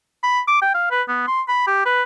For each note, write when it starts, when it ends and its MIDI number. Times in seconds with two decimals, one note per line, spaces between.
0.23 0.40 83
0.48 0.62 86
0.62 0.73 79
0.75 0.91 77
0.91 1.02 71
1.09 1.23 59
1.28 1.42 84
1.48 1.63 83
1.67 1.86 67
1.86 2.03 71